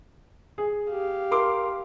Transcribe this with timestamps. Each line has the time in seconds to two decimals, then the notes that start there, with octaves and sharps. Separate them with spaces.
0.58 G#4
0.88 G4 F5
1.31 A#4 C6 D6